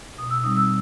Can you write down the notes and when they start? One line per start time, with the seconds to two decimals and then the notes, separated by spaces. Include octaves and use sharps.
0.18 B2 D#6
0.30 E6
0.44 G3 C4 D#4 D#6
0.57 E6